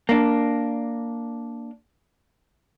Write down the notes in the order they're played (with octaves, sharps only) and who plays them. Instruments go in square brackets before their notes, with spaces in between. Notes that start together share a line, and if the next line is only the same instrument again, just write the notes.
[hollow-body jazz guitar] A#3 D4